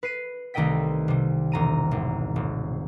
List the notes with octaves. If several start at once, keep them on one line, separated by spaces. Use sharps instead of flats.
B4 C7 D#7
C2 D#3 A3 D#5 G5 B6
C3 G3
E1 A#5 D#7
G#1
D#1